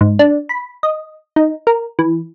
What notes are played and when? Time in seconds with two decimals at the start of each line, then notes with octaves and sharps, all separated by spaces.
0.01 G#2
0.19 D4
0.49 B5
0.83 D#5
1.36 D#4
1.67 A#4
1.99 E3